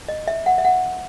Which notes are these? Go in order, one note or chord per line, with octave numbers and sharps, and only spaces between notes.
D#5
E5
F#5
E5
F#5